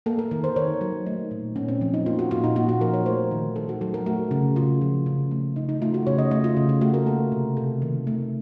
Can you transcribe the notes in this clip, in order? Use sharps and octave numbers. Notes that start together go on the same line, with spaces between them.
A#3 A4
A#4
D#3 A#4
C5
D#3 C#5
F#3
A3 D#4
A#2
A#2 C#4
C4
F3
D#4
A#3 F4
F#4
A#2 F4
D#4
A#2 F#4
F#4
F3 A#4
C#5
A3 C5
D#3
D#3 A4
F#4
F#3 A4
A#4
A3 F#4
C#3
C#3 F4
F3
C#3
A3
C#3 D#4
D#4
A3 F4
F#4
C#3 C#5
D#5
A3 D#5
F4
C#3
F4
A3 F#4
A#4
A#3 A4
C3
C3 A4
D#3
A3